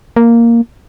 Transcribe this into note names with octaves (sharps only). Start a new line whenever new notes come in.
A#3